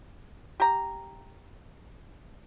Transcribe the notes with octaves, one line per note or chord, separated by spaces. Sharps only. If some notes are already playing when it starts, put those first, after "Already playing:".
G4 A#5